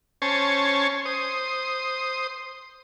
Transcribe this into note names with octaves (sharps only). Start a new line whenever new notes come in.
C#4 C5 C#5 G#5 A5
C5 D#6